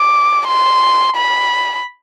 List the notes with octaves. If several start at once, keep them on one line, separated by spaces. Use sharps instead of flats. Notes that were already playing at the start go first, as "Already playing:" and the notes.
Already playing: D6
C6
B5